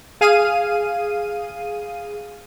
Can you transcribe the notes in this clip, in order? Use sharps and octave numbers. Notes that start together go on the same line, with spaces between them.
G#4 F5 D#7